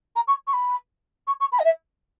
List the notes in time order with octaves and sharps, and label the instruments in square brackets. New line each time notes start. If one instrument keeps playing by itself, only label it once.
[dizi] A#5
C#6
C#6
B5
C#6
C#6
B5
D#5
E5